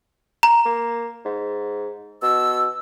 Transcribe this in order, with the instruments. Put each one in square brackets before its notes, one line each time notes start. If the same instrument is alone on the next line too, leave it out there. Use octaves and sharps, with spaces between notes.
[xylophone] A#5
[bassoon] A#3
G#2
[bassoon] B2 [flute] E6